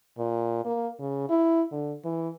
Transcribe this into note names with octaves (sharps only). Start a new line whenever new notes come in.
A#2
A#3
C#3
E4
D3
E3